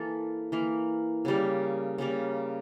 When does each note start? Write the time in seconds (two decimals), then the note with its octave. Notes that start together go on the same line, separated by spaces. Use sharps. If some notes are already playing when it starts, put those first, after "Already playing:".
Already playing: E3 A#3 A4
0.52 E3 A#3
1.25 C#3 G3 A#3
1.98 C#3 G3 A#3